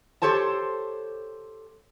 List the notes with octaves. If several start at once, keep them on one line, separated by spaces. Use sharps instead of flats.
G4 A4 C5 C#5 A5